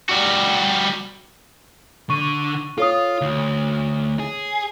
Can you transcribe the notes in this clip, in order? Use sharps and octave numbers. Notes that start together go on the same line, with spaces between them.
G3 F#4
D3 C#6 D#7
F4 A4 C#5 D#6
D2
G#4